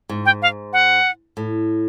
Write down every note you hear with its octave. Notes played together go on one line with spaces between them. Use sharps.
G#2
G5
F5
F#5
A2